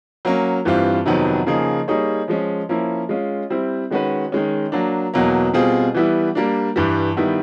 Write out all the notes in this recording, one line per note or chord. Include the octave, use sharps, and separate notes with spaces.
F#3 A#3 C#4
G2 E3 G3 C4 F4
F2 C3 D#3 F#3 B3
C#3 F3 A#3 D#4 G#4
G3 A#3 D#4 G#4 C#5
F3 G#3 C#4
F3 A#3 C#4 E4
G#3 C#4 F4
G3 C4 E4
D#3 G#3 C#4 F#4 B4
D#3 G#3 C#4
F#3 A#3 D4
E2 B2 F#3 A#3
B2 G3 C4 F4 G#4
E3 G3 B3 E4
G3 A#3 D4
G2 E3 G3
D#3 G3 B3 E4